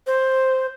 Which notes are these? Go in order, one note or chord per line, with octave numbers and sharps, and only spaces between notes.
C5